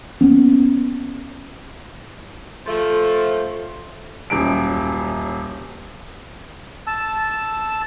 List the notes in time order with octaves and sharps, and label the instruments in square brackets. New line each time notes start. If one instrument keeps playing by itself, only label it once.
[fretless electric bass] A#3 B3 C#4
[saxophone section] F3 A3
[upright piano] D#1 F#2 D7
[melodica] A5 E6